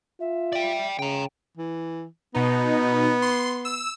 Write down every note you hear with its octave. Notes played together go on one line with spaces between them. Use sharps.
F4 E5
D5 G5
C#3 G5 A#5
E3
B2 B3 D#4
C6
E6